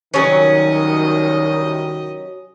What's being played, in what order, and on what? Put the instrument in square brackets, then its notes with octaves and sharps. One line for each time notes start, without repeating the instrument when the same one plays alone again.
[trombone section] C2 D#3 [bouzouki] F#3 C#4 [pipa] A4 C#5 G#5 [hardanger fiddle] D#5